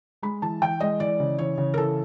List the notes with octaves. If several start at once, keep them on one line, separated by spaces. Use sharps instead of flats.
G#3 B5
E3 A5
E3 G5
G#3 D#5
E3 D5
C#3
E3 C#5
C#3
A#4
E3 A4